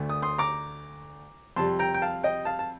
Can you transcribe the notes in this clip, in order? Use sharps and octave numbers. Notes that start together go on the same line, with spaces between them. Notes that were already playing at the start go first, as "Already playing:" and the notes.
Already playing: D2 D3 A3
D#6
C6 D#6
A#5 D6
F2 C3 G3 A5 C6
G5 A#5
G5
F5 A5
D#5 G5
F5 A5
A5